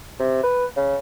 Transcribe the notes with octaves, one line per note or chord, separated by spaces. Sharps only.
C3
B4
C#3